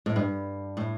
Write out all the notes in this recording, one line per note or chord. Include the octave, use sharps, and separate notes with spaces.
A2
G2
A2